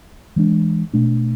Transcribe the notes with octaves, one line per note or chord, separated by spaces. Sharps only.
E3 G#3 D4
B2 A3 D4